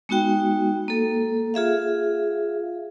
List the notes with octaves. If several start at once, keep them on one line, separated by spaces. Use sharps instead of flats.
G#3 B3 D#4 F#4 G5
A#3 A4
F4 G#4 E5 F5